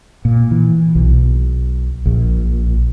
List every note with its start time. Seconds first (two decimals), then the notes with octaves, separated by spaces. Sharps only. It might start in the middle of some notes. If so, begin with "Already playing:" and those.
0.25 A#2
0.51 E3
0.95 B1
2.06 A#1